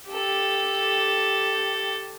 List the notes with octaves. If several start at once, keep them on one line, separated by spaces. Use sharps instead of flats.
G4 A4